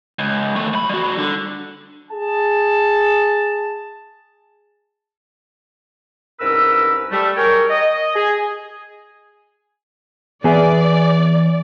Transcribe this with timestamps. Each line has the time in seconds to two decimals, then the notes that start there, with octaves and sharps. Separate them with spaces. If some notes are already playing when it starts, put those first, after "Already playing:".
0.19 C#2
0.56 D#3 A3
0.73 F#2 B5
0.89 G3 F#4
1.18 D3
2.11 G#4 A5
6.39 C2 G#2 C#4 A#4 B4 E6
7.11 G3 A3
7.37 G#4 A#4 C#5 G5
7.70 D#5
8.14 G#4
10.44 E3 B3 G#4 D5 E5